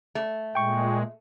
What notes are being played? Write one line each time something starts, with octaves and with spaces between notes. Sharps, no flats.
A3
A#2 G#3 G5 C#6